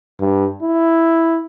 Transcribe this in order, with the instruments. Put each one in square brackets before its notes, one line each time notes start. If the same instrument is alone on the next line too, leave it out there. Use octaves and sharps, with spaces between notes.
[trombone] G2
E4